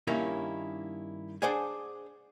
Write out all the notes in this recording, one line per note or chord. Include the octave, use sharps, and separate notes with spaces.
G2 D#3 A#3 C#4 D#4 E4
D4 G#4 C5 D5 F#5 G#5